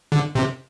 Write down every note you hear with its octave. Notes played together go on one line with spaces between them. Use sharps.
D3
C3